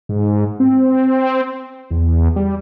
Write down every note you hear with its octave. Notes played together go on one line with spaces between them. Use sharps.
G#2
C4
E2
G3